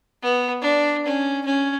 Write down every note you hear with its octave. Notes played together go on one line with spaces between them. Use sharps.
B3
D4
C#4
C#4